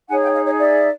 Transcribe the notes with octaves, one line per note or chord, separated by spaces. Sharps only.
D#4 G#4 C#5 F#5 G#5
F5 G5
D#5 F5
C#5 D#5
D5 E5